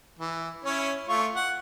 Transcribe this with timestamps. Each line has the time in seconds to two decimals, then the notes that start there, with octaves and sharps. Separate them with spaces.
0.19 E3
0.65 C#4 E4 C#5
1.08 A3 F4 C#6
1.36 F#5